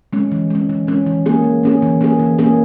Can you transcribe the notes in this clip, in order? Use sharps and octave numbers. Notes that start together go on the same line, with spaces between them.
G#3 C#4
E3
G#3 C#4
E3
G#3 C#4
E3
A#3 C#4 G#4
E3
A#3 C#4 G#4
E3
A#3 C#4 G#4
E3
A#3 C#4 G#4